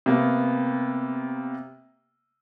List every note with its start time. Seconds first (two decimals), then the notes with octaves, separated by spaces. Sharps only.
0.06 C3 A#3 B3